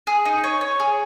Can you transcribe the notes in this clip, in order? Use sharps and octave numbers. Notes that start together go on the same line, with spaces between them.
G#4
D#4
C#5
C#5
G#4